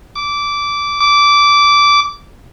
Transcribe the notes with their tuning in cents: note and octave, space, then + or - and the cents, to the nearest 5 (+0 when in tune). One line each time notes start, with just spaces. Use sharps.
D6 -15
D6 -15